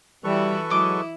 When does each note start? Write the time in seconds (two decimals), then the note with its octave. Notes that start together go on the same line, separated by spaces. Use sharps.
0.24 E3 G3 E4 F#4 A4 B4 C#6
0.70 F#3 G#3 E4 D#5 D6